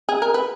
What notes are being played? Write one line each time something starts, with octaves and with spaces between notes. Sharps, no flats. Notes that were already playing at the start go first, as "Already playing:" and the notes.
G#4
A#4
B4